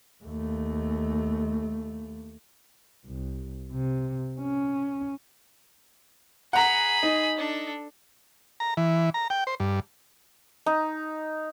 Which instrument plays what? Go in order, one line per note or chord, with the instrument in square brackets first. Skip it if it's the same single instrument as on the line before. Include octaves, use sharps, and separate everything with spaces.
[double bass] D#2 A3
C2
C3
C#4
[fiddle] G#4 B5 [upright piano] F#5 A#5
[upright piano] D#4
[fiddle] D4 A4
[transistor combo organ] A#5
E3
A#5
G5
C5
G2
[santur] D#4